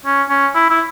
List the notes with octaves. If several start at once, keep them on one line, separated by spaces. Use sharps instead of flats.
C#4
C#4
E4
E4